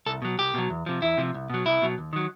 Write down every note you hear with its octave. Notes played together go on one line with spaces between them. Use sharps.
C2 A4
B2 F#3
C2 G4
B2 F#3
E2
C3 F3
E2 E4
C3 F3
C2
B2 F#3
C2 E4
B2 F#3
D#2
D#3 F#3